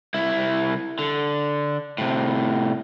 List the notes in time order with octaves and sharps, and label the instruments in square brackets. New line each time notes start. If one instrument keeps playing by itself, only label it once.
[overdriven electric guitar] C2 E4
D3
A2 C3